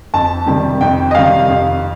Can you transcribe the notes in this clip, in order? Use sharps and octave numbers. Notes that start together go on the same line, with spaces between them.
F2 A5
C3 D#3 G3
F2 G5
D#5
C3 D#3 G3 F5
F2